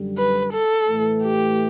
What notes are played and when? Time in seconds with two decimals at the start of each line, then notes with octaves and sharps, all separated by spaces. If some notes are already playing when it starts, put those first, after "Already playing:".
Already playing: F#2 D3 G3
0.18 B4
0.53 A4
0.88 A2 E3 A3
1.24 G4